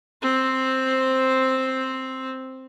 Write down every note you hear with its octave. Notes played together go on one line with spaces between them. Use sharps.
C4 C5